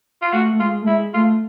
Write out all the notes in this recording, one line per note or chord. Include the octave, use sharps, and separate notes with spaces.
F4
A3 F#4
A3
G#3 F4
A3
G#3 E4
A3 F4